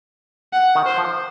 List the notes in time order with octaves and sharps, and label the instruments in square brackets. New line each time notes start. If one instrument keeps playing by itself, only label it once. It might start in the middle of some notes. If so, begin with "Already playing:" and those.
[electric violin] F#5
[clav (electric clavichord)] D#3
[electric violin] C5
[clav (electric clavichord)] F3